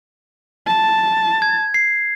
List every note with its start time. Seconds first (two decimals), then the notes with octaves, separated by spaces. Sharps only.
0.67 A5
1.42 G#6
1.74 C7